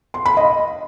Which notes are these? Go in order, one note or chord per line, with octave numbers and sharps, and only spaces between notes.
C6
B5
D#5